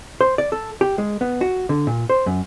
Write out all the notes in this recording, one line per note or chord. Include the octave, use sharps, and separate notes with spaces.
C5
D5
A4
G4
G#3
B3
F#4
D3
A#2
C5
F#2